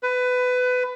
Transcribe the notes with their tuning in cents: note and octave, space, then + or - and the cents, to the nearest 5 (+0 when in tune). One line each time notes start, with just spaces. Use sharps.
B4 +20